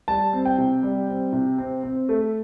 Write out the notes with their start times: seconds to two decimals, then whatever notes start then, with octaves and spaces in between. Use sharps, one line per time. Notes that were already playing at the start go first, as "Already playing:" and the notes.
0.08 G3 A5
0.33 C4
0.45 G5
0.58 C3
0.83 G3
1.08 C4
1.33 C3
1.58 C4
1.83 C4
2.09 A3